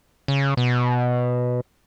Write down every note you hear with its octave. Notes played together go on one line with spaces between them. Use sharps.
C#3
B2